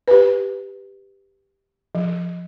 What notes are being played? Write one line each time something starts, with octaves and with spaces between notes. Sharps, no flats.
G4 B4
F3